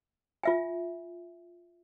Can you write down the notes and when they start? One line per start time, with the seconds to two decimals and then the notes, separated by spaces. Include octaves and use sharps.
0.43 F4 E5 G#5